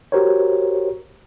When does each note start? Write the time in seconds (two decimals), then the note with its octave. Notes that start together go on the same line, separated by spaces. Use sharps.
0.12 F#4 G4 A#4 C5 C#5